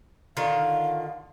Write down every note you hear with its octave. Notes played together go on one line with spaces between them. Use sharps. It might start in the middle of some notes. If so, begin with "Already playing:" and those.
D3 D#3 F4 F5